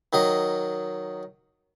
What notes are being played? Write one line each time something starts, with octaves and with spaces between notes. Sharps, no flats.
D#3 F#3 D#5